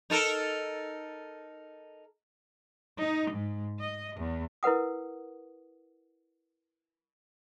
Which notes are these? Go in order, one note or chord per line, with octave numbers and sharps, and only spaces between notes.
D#4 A4 A#4
D#4
G#2
D#5
E2
E4 A#4 B4 F#5 D#6